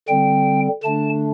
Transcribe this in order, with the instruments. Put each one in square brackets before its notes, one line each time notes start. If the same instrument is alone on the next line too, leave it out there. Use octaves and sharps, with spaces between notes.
[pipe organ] D3 G3 C4 G5
D3 A3 D4 A5